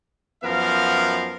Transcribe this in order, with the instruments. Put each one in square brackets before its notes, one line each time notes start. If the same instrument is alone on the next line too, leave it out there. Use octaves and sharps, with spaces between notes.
[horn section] F#2 F3 B3 A#4 F5